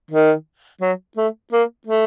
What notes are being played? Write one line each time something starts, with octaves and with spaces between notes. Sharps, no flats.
D#3
F#3
A3
A#3
A3